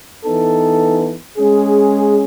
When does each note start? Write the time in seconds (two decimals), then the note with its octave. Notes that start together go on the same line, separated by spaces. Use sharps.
0.25 E3 B3 D#4 A4
1.38 G#3 C#4 G#4